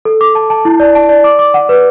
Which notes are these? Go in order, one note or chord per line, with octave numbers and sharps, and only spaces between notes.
A4
D6
A5
A5
E4
D5
A5
D5
D6
D6
F#5
B4